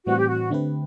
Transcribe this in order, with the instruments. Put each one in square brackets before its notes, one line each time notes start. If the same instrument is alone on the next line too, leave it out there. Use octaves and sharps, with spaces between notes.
[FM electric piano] A2 E3 G3 C4 [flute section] F#4
[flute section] G4
F#4
[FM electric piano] D3 A3 C4 G4 B4